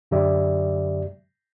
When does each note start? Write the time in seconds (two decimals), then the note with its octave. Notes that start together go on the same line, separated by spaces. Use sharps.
0.11 F#2 D3 F#3 G4 D5 E5